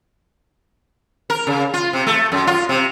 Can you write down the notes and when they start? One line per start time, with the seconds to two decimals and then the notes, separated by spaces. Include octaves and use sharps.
1.30 A#4
1.47 C#3
1.74 F4
1.93 C3
2.07 A3
2.32 F#2
2.47 F4
2.69 C3